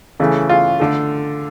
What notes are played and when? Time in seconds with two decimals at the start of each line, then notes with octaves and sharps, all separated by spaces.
0.20 C#3 E3 A3
0.49 F4
0.80 D3 A3